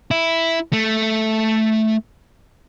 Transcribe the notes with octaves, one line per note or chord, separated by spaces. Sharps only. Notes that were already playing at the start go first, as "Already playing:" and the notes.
E4
A3